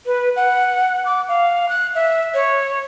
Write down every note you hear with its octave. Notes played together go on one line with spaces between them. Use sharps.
B4
F#5
D6
F5
F#6
E5
C#5